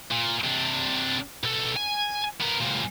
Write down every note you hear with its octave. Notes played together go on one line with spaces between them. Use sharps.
A#2
C3 D4
B2 A4
G#5
B3 A#4
C#2 A#2